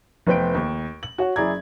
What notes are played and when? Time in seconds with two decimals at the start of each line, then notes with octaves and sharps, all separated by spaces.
0.27 F1 B3 B4 C5 G5 D7
0.55 D#2
1.03 F#7
1.18 F#4 C#5 F#5
1.36 F#1 E4 G#4 D5 A#5 G#6